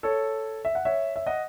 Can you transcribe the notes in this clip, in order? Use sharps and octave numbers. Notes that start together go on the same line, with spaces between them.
A4 C#5
E5
F#5
C#5 E5
E5
D#5 F#5